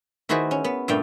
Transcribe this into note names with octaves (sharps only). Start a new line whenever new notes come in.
D#3 E4 F#4 G#4 B4 C5
C#4
B3
G2 A#2 A3 D5 F5 G5